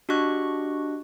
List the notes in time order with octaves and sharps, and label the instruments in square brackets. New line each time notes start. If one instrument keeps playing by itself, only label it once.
[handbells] D4 F#4 G4 D#5 C#6 F#6